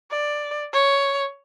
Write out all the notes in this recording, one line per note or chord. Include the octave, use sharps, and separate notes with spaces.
D5
C#5